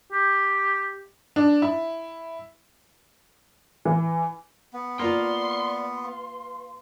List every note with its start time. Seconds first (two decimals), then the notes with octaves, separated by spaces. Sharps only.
0.12 G4
1.36 D4
1.62 E4
3.85 E3
4.73 B3
4.99 A#3 F4 D5 F5 C6
6.05 B4 F5